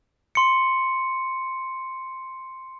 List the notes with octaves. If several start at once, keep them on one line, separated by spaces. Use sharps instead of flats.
C6 C#7